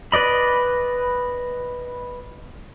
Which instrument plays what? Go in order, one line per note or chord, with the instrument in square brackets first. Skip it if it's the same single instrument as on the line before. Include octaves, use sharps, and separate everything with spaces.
[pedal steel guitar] B4 D5 D#5 B5